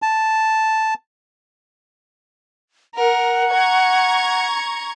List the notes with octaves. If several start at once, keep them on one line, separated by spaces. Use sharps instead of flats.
A5
A#4 F#5
A#5 C#6 G#6